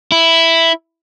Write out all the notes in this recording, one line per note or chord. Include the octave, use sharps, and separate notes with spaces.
E4